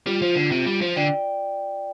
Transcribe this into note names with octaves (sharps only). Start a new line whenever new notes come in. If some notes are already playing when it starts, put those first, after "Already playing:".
G3 F4
F3
D3
C3
G3
F3
D3 D5 G5